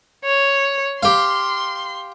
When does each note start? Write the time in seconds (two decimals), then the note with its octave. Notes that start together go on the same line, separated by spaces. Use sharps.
0.25 C#5
1.03 G4 F5 C6